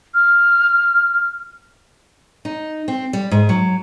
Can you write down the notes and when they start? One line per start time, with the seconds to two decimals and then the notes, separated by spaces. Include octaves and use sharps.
0.14 F6
2.45 D#4
2.88 C4
3.13 G3
3.31 G#2
3.49 F#3